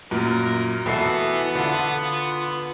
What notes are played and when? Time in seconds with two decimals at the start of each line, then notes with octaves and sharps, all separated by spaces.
0.11 F#2 A#2 A#4
0.86 B2 E3 B3 A4 E5 C7
1.55 D3 F4 A4